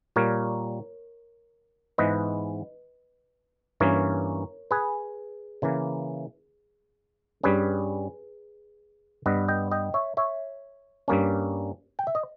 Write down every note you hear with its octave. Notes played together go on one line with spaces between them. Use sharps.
A#2 G3 A#3 A#4 C#5
G#2 E3 G#3 B3 B4 D#5
G2 E3 A#3 C#4 A#4 C#5
G#4 B4
C#3 E3 A#3
G2 G3 C#4 G#4 B4
G2 G3 B3 B4 D#5
D#5 G5
D#5 G5
C#5 E5
C#5 E5
G2 G3 A#3 C#4
G5
E5
D#5